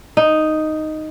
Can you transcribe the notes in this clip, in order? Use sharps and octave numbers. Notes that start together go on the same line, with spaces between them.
D#4